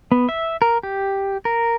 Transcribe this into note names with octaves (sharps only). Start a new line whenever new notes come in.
B3
E5
A#4
G4
A#4